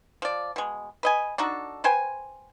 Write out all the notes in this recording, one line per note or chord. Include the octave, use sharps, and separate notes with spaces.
F3 D5
B2 G#3
B4 D#5 G#5
D4 D#4 F#4 A4
B4 C5 G5 G#5